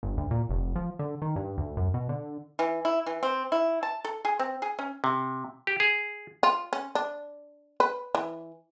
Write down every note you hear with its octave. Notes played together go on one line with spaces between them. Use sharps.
G1
D2
A#2
F1
F3
D3
D#3
G2
D2
F#2
B2
D3
E3
E4
E3
C4
E4
A5
A4
G#4
C4
G#4
C#4
C3
G4
G#4
F4
C#4
D4
B4
E3